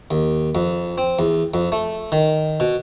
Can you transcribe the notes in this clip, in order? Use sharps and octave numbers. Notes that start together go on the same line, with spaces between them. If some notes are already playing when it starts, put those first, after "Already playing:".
D#2
F2
C4
E2
F2
A3
D#3
B2